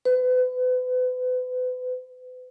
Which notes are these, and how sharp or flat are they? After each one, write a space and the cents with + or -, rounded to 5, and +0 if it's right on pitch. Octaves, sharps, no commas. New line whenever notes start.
B4 +35